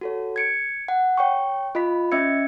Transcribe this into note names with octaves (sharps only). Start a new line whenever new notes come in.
F#4 A4 C#5
G#6 C#7 D7
F#5
C#5 G5 C#6
F4 D#5 B5 B6
C#4 D#5 E5 E6 G#6 C#7